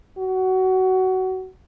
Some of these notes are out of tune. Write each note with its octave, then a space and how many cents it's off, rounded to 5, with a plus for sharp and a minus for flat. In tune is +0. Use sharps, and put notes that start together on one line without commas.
F#4 +20